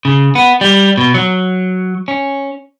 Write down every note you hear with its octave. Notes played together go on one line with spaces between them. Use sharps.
C#3
B3
G3
B2
F#3
C#4